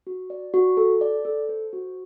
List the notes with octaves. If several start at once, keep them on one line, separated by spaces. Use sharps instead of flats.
F#4
D5
F#4
A4
D5
A4
C5
F#4